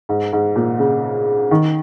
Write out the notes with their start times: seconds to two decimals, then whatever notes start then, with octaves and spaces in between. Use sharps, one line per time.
0.09 G#2
0.33 G#2
0.56 A#2
0.79 C#3
1.51 D#3